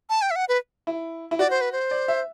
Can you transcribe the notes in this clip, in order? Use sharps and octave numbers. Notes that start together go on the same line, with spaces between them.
A5
G5
E5
F#5
B4
E4
E4
F#4 D5
C5
B4
C5
D5
E5